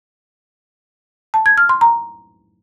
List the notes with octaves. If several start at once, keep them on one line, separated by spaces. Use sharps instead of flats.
A5
G#6
F6
C6
A#5